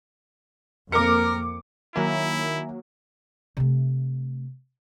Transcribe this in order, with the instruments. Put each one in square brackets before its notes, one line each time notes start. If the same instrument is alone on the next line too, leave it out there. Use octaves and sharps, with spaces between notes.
[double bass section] F2 A#3 C4 [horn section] A#4 [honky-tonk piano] D6 C#7
[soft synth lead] D#3 [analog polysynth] F#3 A#3 [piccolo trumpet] E4 [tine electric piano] E5 G#5 A#5
[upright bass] C3 A3